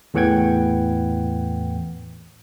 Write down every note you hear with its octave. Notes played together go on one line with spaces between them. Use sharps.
E2 A2 E3 F#5 G5 G#6